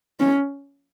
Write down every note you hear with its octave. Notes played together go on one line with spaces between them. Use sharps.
C#4